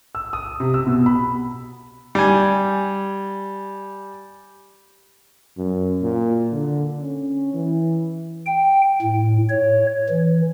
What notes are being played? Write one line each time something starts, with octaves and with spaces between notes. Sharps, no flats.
E6
D#6
C3
E6
B2
B5
G3 G#5
F#2
A#2
D3
C#4
E3
G5
A2
C#5
E3